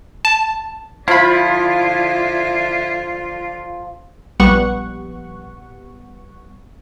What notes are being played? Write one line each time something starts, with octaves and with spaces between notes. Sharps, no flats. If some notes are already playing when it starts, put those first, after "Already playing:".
A5
D3 F3 E4 F4 F5 B5
A#1 G3 B3 F#5 C#6